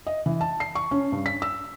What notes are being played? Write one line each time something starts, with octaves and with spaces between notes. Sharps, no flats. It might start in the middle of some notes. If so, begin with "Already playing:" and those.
D#5
E3
A5
C7
C#6
C#4
G2
B6
E6